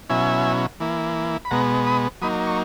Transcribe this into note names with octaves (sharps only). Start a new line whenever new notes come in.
B2 F#3 C#4 E4 E5 G#5
E3 A#3 E4
B5
B2 G#3 B3 F#5 A#5
B5 D#6
F#3 A#3 D#4 B5 D#6
C#6